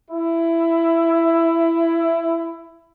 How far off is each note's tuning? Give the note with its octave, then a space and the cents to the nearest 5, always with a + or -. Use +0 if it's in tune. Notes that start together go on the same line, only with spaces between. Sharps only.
E4 +15